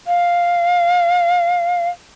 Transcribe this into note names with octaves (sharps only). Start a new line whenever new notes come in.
F5